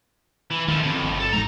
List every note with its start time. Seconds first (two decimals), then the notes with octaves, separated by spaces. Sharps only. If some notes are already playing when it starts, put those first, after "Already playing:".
0.51 E3
0.68 D#3 F3 A3
0.83 F2 A2 D3 C4
1.03 G1
1.20 A4
1.33 G#2 F#3 G#3 D#4 A#5